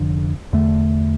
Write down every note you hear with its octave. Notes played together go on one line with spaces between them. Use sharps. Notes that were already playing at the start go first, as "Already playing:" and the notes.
Already playing: F1 F2 D3
E2 D3 A3